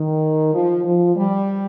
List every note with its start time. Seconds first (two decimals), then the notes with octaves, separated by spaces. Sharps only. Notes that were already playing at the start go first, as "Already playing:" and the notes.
Already playing: D#3
0.53 F3
0.85 F3
1.15 G3